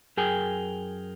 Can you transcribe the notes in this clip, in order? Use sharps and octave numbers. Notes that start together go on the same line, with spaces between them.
F#2 G#4 A#4 G5 G#5